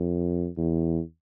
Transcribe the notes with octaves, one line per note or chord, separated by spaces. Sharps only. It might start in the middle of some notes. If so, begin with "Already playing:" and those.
Already playing: F2
E2